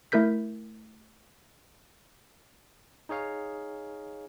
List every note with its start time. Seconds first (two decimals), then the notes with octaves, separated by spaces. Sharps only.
0.12 A3 E4 A#4 G6 B6
3.09 D#4 G#4 C#5 F5